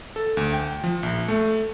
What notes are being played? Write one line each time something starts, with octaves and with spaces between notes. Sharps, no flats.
A4
D2
G5
F3
A#1
A3